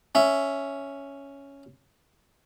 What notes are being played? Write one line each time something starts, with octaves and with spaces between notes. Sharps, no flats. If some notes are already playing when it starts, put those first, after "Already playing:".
C#4 E5